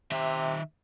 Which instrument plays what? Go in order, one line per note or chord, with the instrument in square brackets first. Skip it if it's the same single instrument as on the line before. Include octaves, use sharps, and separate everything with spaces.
[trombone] C3 [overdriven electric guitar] D#3 E5